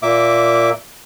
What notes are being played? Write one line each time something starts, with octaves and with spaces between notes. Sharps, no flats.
A#2 A#3 E5 D6